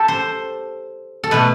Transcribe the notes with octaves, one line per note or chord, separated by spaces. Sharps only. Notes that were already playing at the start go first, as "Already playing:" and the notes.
Already playing: G4 A4
C5
A4
B2 A3 B4